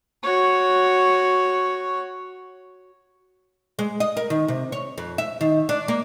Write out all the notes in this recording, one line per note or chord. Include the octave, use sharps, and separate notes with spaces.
F#4 C#5
G#3
D#5
A#4
D#3
C3
C#5
F2
E5
D#3
D4
A#3